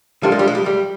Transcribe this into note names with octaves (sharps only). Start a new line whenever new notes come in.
G3 A#3 D4 F4 A4
G#3
G3
G#3
G3
G3